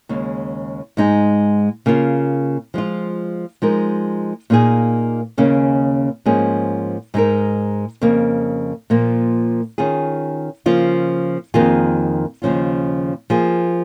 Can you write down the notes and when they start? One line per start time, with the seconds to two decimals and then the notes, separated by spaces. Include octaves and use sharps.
0.09 D#2 C#3 G#3
0.97 G#2 G#3 D#4 G#4
1.86 C#3 A#3 F4
2.74 F3 G#3 F4
3.62 F3 G#3 D#4 A#4
4.50 A#2 A#3 D#4 G#4
5.38 D#2 C#3 A#3 C#4
6.26 G#2 F3 A#3 C#4 G#4
7.14 G#2 G#3 D#4 A#4
8.02 F2 C#3 A#3
8.90 A#2 F3 A#3
9.78 D#3 C#4 F4 G#4
10.66 C#3 F3 A#3 F4
11.54 F2 D#3 A#3 F4 G#4
12.42 D#2 C#3 F3 C#4 F4
13.30 F3 A#3 F4 G#4